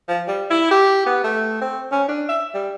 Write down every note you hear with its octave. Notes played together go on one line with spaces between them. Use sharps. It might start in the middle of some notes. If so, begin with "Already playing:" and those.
F3
G3
E4
G4
B3
A3
C4
C#4
D4
E5
G3